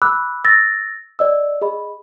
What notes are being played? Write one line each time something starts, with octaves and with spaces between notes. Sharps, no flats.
B5 D6 E6 F#6
E6 A6 A#6
D5 D#5 E6
G#4 D#5 B5